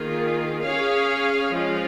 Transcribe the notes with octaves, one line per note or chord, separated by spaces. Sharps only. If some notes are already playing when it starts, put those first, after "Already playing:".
Already playing: D#3 A#3 F4 G#4
C#4 G#4 C#5 F5
F3 G#3 C#4 F4